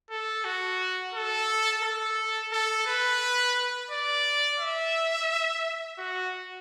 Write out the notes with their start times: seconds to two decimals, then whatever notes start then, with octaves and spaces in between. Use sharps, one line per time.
0.10 A4
0.45 F#4
1.14 A4
1.83 A4
2.52 A4
2.87 B4
3.91 D5
4.59 E5
5.98 F#4